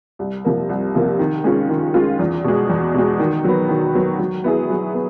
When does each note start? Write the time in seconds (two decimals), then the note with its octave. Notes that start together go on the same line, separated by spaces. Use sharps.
0.19 C2
0.45 C3 F3 A#3
0.69 C2
0.95 C3 F3 A#3
1.19 D#3
1.44 G#3 C#4 F4
1.69 D#3
1.94 G#3 C#4 F4
2.19 E2
2.44 B2 G#3
2.70 E2
2.94 B2 G#3
3.19 D#3
3.44 F#3 B3
3.69 D#3
3.95 F#3 B3
4.19 F#3
4.44 B3 E4 G#4
4.70 F#3
4.94 B3